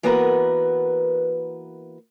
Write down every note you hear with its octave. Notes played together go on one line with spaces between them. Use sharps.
E3 A#3 B3 F#4 A#4 B4